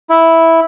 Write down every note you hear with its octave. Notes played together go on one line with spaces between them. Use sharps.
E4